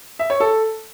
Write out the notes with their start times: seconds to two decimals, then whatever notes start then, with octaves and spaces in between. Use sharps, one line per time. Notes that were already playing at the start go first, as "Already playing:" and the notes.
0.19 E5
0.30 C#5
0.40 A4